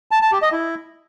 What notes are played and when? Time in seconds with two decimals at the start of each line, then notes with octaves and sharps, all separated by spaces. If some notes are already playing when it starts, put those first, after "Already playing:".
0.11 A5
0.22 A5
0.32 G4
0.42 D#5
0.52 E4